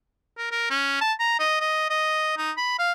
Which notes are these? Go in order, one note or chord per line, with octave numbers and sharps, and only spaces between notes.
A#4
A#4
C#4
A5
A#5
D#5
D#5
D#5
D#4
B5
F5